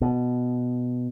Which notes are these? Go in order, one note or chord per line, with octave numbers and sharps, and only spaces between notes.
B2